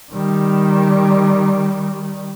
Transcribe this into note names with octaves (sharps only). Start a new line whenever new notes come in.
D#3 G3